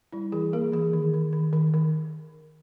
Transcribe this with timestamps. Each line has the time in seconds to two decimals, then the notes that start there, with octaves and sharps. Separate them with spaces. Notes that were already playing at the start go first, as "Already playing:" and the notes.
0.13 G3 E4
0.32 E3 G#4
0.53 A#3 A#4
0.72 E3 G#4
0.93 D#3
1.14 D#3
1.33 D#3
1.53 D#3
1.74 D#3